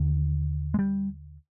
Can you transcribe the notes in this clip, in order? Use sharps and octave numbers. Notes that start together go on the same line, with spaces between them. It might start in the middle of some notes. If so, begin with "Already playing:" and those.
Already playing: D#2 D3
G#3
G3